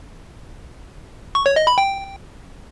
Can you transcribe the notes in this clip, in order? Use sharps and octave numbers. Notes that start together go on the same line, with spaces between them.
C#6
C#5
D#5
B5
G5